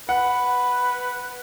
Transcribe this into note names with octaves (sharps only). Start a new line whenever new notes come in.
B4 F#5